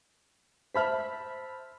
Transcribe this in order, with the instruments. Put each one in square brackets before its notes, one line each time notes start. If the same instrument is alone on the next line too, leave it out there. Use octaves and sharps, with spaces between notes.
[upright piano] C5 A5 F6 [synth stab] E5 B5 B6